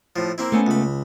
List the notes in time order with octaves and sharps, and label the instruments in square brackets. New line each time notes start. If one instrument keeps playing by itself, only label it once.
[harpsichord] A2 F3
A#3 C4 E4
[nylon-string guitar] A3 B3 C#4
[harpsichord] C#2 B5